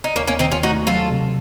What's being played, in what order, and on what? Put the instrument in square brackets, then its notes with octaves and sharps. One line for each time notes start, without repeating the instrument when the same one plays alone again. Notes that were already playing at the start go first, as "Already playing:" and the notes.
[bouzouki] D#4
[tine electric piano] D#2 [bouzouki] A#3 C#4
[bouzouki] A#3 C#4
[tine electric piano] D#3 [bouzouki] C4 D#4
[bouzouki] C#4 F4
[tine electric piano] A3 [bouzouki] D#4 F#4
[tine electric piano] F#3 [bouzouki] F4 A4
[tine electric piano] C3